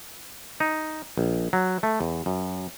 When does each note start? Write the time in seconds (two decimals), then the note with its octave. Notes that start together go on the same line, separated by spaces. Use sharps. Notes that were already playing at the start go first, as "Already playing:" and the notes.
0.60 D#4
1.18 A#1
1.53 F#3
1.83 A3
2.01 E2
2.26 F#2